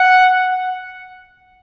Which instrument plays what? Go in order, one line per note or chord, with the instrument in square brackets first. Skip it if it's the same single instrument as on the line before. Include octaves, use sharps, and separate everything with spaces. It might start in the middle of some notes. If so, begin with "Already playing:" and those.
Already playing: [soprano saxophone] F#5